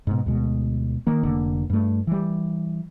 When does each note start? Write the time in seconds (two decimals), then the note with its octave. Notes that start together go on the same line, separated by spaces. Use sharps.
0.07 G#2 B2
0.26 D2 B2 G#3
1.07 D#3 A#3
1.23 F1 D3 A#3
1.70 G2 A3
2.07 E3 G3